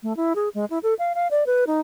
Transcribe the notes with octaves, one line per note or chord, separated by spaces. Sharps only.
A3
E4
G#4
G#3
E4
A4
F5
F5
D5
B4
D#4